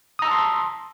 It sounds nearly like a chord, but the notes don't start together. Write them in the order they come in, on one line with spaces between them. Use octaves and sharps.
D#6 A#5 E6 A5 C6